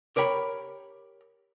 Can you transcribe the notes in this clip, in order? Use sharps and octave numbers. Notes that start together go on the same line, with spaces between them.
G4 A#4 C#5 G5 B5